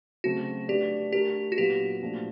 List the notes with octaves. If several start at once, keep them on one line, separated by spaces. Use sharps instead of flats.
C#3 F#3 A3 C4 F#4
A3 D4 F#4 G4 B4 D5
A3 D4 F#4 G4 A#4
F#4
A#2 F#3 B3 D4 F4 G4
A#2 F3 A3 D4 F#4